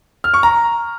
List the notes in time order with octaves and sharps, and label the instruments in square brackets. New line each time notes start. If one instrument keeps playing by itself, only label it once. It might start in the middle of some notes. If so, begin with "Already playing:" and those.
[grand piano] F6
C#6
A#5